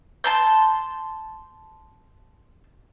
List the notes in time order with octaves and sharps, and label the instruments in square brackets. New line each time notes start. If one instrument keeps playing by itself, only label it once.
[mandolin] A5 C6 G6